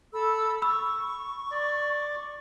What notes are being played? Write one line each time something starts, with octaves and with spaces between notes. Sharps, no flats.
A4 B5 E6
B5 C#6 E6
D5